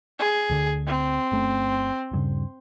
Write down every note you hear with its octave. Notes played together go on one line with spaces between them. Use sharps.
G#4
D2 D3
C4
G1 A3 C#4
D#1 G2 C#3